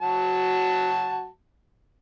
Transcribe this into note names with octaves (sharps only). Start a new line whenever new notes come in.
F#3 F#4 A5